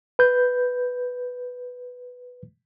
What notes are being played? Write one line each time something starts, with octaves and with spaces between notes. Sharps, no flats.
B4 G6